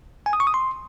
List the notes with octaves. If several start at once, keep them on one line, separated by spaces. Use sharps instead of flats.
G#5
D#6
C#6
D#6
C6